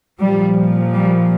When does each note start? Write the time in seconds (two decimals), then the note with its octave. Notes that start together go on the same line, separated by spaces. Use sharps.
0.20 A#2 F3 G3
0.93 G3